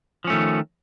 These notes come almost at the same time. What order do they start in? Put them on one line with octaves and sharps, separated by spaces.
F3 C#4 A3 D#3